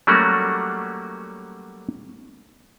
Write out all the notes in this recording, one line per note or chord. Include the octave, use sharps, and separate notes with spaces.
F#3 G3 A3 A#3 C#4 F#4